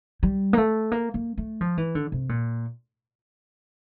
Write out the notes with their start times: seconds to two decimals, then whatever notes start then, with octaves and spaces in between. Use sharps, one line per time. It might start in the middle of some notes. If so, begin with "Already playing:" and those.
0.23 G3
0.53 A#3
0.58 A3
0.92 A#3
1.14 A#3
1.37 A3
1.61 F3
1.78 E3
1.95 D3
2.12 C3
2.29 A#2